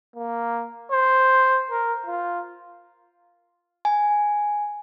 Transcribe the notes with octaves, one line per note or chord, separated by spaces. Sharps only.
A#3
C5
A#4
F4
G#5